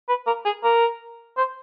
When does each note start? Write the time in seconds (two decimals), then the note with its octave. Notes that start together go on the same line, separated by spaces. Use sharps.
0.09 B4
0.27 A#4
0.45 G#4
0.64 A#4
1.37 C5